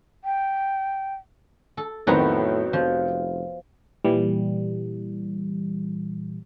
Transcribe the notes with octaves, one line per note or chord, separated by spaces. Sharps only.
G5
A4
F2 A2 D#3 F#3 B3 C4 A#5
F1 F3
A#2 E3 G3